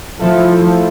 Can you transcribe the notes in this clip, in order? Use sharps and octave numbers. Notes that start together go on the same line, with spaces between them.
F3 A3 E4 A4